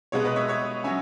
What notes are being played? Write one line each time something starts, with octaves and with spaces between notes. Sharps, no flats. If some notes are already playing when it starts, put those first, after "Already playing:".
B2 G#3 B3 C#5
B4 D#5
C#5 E5
C#5 E5
F#3 C#4 E5 G#5